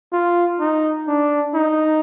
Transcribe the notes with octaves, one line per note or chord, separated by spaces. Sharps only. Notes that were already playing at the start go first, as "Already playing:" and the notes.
F4
D#4
D4
D#4